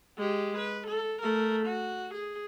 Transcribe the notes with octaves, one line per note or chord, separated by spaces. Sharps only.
G#3 G4
B4
A4
A3 A#4
F#4
G#4